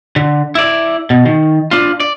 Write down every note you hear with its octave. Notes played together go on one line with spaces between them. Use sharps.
D3
E4 D5
B2
D#3
D4 F4
D5